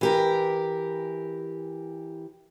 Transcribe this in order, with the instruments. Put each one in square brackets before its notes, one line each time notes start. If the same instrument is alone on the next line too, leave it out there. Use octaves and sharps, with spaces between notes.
[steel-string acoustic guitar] E3 G4 A#4